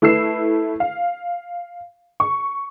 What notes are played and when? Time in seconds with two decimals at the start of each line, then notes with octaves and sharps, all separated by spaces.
0.02 A3 E4 B4 E6 C7 E7
0.80 F5
2.20 C#6